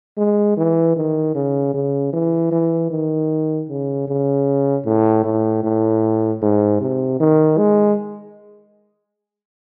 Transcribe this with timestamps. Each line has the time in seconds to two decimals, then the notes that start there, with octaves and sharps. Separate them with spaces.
0.18 G#3
0.57 E3
0.96 D#3
1.35 C#3
1.74 C#3
2.13 E3
2.52 E3
2.91 D#3
3.69 C#3
4.08 C#3
4.86 A2
5.24 A2
5.64 A2
6.42 G#2
6.81 C3
7.20 D#3
7.58 G#3